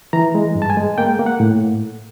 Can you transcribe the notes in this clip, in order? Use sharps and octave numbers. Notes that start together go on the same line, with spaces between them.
E3 A#5
G#3
G2
A5
G#5
G#3
A#3 G5
A#3
F#5
A2